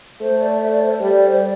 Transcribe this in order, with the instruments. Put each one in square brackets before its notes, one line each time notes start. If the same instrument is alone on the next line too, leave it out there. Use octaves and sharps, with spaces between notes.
[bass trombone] A3 [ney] C5
[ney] D5
E5
D5
C5
A4
[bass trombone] G3 [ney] D5
[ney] D5
C5
D5